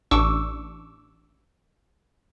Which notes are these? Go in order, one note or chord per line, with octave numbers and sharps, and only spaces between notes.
A1 D4 C#6 D6 E6